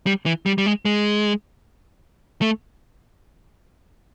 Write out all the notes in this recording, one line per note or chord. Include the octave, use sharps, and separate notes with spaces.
G3
E3
G3
G3
G#3
G#3
A3